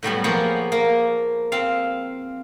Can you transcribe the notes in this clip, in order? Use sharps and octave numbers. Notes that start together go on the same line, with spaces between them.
A2 F#3 G3 B3
F3 A#3 B3 G#4 C#5
A#3
C4 F5